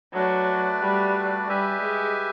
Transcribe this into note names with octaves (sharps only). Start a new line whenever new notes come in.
F#3 A3 D4 F#4 B4 D5
G3
G3 G4 B4 E5 G#5
G#3